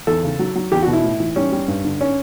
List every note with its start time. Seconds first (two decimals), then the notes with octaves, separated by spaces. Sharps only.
0.07 E2 A4
0.23 C#3
0.39 F#3
0.55 F#3
0.72 E2 G4
0.83 F#4
0.87 B2
0.93 E4
1.04 A2
1.20 E3
1.36 G3 C#4
1.52 G3
1.68 G2
1.85 D3
2.01 C#4